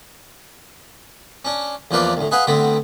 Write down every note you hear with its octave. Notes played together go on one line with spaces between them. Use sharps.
C#4 D4
E2 F3 A#3 B4 D5 F5
D2 A2
G#4 B4 D#5 F5 F#5
D2 D3 B3 C4 B5